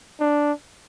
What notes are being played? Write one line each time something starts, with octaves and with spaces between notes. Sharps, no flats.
D4